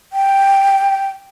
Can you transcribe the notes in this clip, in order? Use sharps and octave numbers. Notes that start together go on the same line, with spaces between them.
G5